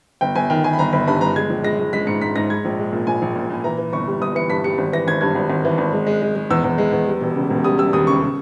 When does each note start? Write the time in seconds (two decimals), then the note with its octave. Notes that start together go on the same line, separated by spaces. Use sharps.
0.21 G1 G5
0.35 G1 G#5
0.50 D#3 G5
0.64 D#3 G#5
0.73 B5
0.79 G1 A#5
0.93 G1 B5
1.07 G2 B5
1.21 G1 A#5
1.36 G#3 G#6
1.50 A#1
1.64 G#3 A#6
1.79 G#3
1.93 G#3 B6
2.07 G#2 C#7
2.21 G#2 B6
2.36 G#2 A#6
2.50 G#3 G#6
2.65 A#1
2.79 G#3
2.93 A#2
3.07 A#1 G#5
3.22 A#1
3.36 A#2
3.50 A#2
3.64 E3 A#5
3.78 E3
3.93 G1 C#6
4.07 G3
4.21 G1 D#6
4.35 E3 C#7
4.49 G2 B6
4.64 G3 C#7
4.78 G#1
4.93 E3 A#6
5.07 G#1 G#6
5.21 G2 G#6
5.35 G#1
5.50 G#1
5.65 E3
5.78 G#1
5.93 G#3
6.07 G#3
6.22 G#3
6.36 G#3
6.50 E2 E6
6.64 E2
6.78 G#3
6.92 E2
7.07 G3
7.21 E1
7.35 C#3
7.50 E1
7.64 G3 D#6
7.78 G3 E6
7.93 D#2 D#6
8.07 C#3 C#6
8.22 C#3